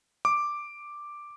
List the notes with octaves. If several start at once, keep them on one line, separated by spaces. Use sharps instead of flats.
D6